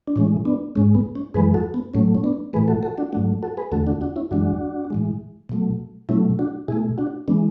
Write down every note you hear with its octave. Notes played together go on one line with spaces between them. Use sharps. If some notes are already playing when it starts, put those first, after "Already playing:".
D4
A2 E3 G#3 C#4
B3 D4
G#2 G#3 C#4
B3
C#4
F#2 E3 G#3 G#4 B4
F#4 A4
B3
A2 F#3 A3 C#4
C#4
B3 D4
A2 E3 A3 G#4 B4
F#4 A4
F#4 A4
D4 F#4
G#2 F#3 A3 D4 F#4
F#4 A4
G#4 B4
E2 D3 A3 F#4 A4
D4 F#4
D4 F#4
C#4 E4
F#2 E3 G#3 D4 F#4
A2 E3 G#3
B2 F#3 A3
B2 F#3 A3 C#4 E4
D4 F#4
B2 A3 E4 G#4
D4 F#4
E3 G#3 B3 D4